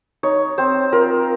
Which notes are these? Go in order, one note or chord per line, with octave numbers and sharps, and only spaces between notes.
D#4 C#5
C4 C5
F4 A#4